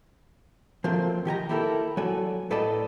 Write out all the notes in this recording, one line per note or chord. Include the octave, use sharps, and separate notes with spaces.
F3 F#3 A3 A#3 C4 F4
D#3 G4 G#5 A#5
A#3 E4 G4 A4 A#4
F#3 F#4 A4 D5 G#5
A2 A4 B4 D5 D#5 A5